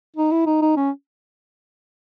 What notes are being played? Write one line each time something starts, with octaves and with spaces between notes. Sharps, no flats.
D#4
E4
D#4
D#4
C#4